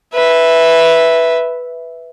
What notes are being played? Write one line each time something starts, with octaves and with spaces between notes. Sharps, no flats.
B4 E5